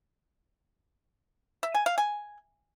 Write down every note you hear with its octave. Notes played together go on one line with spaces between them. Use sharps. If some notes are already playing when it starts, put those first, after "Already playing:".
E5
G#5
F5
G#5